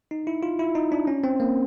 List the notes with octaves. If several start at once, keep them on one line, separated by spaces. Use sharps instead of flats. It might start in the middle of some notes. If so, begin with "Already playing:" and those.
D#4
E4
F4
E4
D#4
D4
C#4
C4
A#3